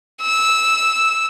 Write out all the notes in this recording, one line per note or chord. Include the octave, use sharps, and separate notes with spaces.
E6